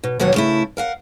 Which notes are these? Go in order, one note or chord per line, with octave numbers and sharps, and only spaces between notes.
B2
D#2 B2 D3 F#3 C#5 F#5
C#3 A3 E4
A#4 F5 F#5